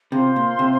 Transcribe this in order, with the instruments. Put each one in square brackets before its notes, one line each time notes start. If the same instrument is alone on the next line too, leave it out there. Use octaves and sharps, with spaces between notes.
[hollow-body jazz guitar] C3 [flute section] F4 C5 F5 C6
[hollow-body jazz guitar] A#2
C3